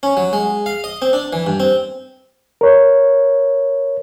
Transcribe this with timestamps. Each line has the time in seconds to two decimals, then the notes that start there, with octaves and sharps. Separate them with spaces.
0.03 C#4
0.17 F#3
0.33 G#3
0.66 F5
0.84 D#5
1.02 C4
1.13 D4
1.33 E3
1.47 G2
1.60 C4
2.61 A#4 C#5